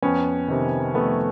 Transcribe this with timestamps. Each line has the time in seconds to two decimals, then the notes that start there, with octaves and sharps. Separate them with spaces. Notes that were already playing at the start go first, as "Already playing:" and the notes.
0.02 F2 B3 C#4
0.48 C3 D#3
0.95 F2 A3 B3